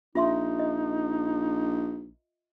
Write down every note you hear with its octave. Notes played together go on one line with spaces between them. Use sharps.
A#1 D#4 F4 E5 C6
D#5